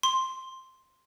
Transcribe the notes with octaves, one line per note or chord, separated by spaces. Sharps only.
C6